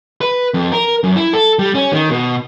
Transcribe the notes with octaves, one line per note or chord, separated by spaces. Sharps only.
B4
F2
A#4
F#2
E4
A4
G3
C#4
D#3
B2